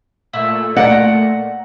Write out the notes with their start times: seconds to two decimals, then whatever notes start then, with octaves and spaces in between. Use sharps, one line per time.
0.33 A#2 A3 E4
0.76 D5 F#5 A#5